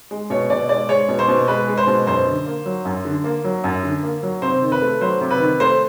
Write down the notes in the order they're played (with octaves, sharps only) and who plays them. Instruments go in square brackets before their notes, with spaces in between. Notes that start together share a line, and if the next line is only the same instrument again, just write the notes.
[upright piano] G#3
B2 C#5
B2 D5
G#3 D5
G#3 C#5
B2
C5
B2
G#3 B4
G#3
C5
B2
F#2 C5
D3
A#3
F#3
F#2
D3
A#3
F#3
F#2
D3
A#3
F#3
C3 C5
D#3
B4
A3
F#3 C5
C3
B4
D#3
A3 C5